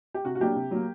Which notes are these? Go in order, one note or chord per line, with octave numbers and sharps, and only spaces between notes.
G4
C3 F#4
F#4
F#3 A#3 D4 G4
C3
F#3 A#3